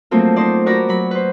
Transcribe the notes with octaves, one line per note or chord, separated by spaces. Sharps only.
F3 F#3 A3 A#3 C4 F4
D#4 C5 D5
F#4 A#4 D5 A#5 B5
F#3 B5
B4 C5